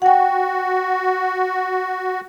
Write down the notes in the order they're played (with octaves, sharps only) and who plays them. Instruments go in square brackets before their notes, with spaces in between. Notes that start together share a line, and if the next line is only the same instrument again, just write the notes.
[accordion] F#4 [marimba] F#5 G5